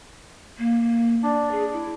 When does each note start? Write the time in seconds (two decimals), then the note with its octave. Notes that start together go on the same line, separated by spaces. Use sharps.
0.59 A#3
1.23 D4 D5
1.52 G#4
1.73 E4